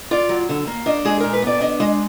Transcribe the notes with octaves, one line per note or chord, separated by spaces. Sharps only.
F4 D5
F#3
D3
A#3
D4 D#5
G#3 G#4
A#2 A#4
B4
B3 D5
D4 D#5
G#3 D#5